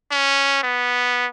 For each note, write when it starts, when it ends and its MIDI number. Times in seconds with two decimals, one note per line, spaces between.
0.11 0.60 61
0.63 1.27 59